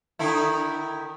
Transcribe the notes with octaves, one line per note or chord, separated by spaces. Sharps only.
D3 D#3 E4